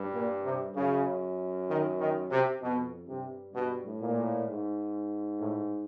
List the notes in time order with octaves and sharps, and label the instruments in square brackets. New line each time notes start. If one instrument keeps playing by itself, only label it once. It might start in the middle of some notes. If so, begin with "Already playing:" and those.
Already playing: [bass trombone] G2
[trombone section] A#2
C3
[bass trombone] F#2 [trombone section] C#3
[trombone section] D#3
D#3
C3
[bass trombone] F2 [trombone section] B2
[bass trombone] G2 [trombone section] C3
[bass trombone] G2 [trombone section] B2
[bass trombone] A2
[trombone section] A#2
[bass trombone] A2
G#2
[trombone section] A2